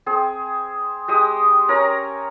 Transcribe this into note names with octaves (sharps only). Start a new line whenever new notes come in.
C4 G#4
G#3 G4 D#6
C#4 A#4 C#5 A#5